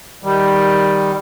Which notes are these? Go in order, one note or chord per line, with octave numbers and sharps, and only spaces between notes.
D#3 G3